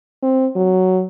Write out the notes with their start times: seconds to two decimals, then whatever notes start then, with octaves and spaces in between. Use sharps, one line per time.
0.23 C4
0.56 F#3